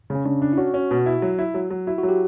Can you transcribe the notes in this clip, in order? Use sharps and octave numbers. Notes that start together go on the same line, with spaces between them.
C#3
C#4
C#3 D4
D4
E4
C#4 F#4
C#4
B2
E4
F#3
E4
F#3
F#3
E4 F#4
F#4
F#3
G4